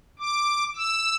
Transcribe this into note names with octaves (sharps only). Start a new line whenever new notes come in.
D6
E6